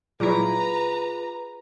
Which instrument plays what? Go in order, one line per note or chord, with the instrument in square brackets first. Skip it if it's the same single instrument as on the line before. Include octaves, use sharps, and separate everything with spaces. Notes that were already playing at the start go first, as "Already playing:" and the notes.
[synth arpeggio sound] A#2 F#3 E4 [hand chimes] F4 G#4 [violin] B4 A#5